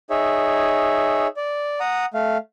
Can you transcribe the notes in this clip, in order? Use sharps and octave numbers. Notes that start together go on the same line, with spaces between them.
D#4 G#4 C#5 E5
D5
F#5 A#5 D#6
A3 F5